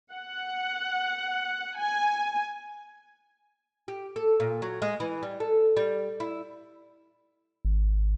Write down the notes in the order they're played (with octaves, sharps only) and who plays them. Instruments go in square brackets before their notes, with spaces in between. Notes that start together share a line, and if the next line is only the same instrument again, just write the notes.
[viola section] F#5
G#5
[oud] G4
A4
A#2
F#3
G#3
E3
G3
A4
G3
E4
[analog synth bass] G#1